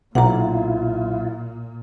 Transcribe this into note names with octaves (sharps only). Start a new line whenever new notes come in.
B1 A#2 E4 F4 F#5 A#5